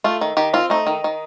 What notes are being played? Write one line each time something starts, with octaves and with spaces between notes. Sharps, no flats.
A3 F4
D#3
D#3 G4
C4 F4
A3 D#4
D#3
D#3